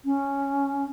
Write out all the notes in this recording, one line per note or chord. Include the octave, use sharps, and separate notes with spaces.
C#4